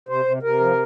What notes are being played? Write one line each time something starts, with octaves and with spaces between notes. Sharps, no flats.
C3 C5
C3
C3 A#4
F3